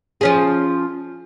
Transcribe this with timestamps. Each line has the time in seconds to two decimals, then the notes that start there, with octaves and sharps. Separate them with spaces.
0.21 F3 C#4 G#4